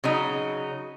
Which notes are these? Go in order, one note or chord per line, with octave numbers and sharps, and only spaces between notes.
C#3 F#3 D#4